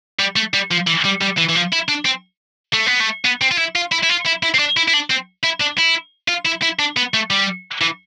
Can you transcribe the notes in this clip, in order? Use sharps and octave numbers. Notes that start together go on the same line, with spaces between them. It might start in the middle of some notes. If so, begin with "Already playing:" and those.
G3
A3
G3
F3
E3
G3
G3
E3
E3
F3
E4
D4
C4
A3
B3
A3
B3
C4
F4
E4
F4
E4
E4
F4
E4
E4
C4
D4
E4
E4
D4
C4
E4
D4
E4
F4
E4
E4
D4
B3
A3
G3
E3